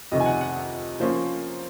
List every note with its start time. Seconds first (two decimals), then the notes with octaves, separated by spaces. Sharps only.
0.12 F2 C3 D#3 D#5
0.20 G#5
0.26 F#5
0.41 F#5
1.00 F3 A#3 C#4 C5